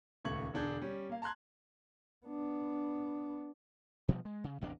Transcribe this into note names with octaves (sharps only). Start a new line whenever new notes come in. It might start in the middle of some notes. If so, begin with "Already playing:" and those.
D#1 C#2 A3 C#6 G#6 F#7
E1 D3 D4 G#4 G6 G#6
G3 C#4
A#3 F5
A5 A#5 C6 F#6 G#6
B3 D4
B2 F3 G3
G#3
C#3
A1 E2 C3 D4